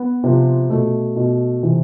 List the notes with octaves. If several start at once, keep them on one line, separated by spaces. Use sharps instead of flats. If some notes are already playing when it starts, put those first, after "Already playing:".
Already playing: B3
C3 F3
B2 A3
B2
C3 E3